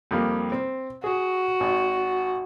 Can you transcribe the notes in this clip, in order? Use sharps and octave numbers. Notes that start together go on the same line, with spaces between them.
F2 G3 A#3
C4
F#4 G#4
G#1